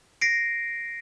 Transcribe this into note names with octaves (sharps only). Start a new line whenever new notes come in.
A#6 C7 D7